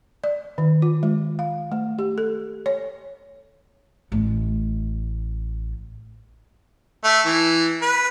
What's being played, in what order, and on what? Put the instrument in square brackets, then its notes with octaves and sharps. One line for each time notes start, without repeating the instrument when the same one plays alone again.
[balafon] D5
D#3
F4
G#3
F5
A3
G4
A4
C#5
[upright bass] A1 A3
[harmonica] A3
E3
B4